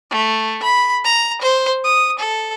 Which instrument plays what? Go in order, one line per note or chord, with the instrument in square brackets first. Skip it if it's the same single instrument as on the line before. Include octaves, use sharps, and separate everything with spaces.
[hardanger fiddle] A3
B5
A#5
C5
D#6
A4